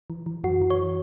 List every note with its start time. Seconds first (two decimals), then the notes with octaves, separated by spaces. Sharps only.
0.10 E3
0.26 E3
0.44 F#2 F#4
0.62 E3
0.70 C#5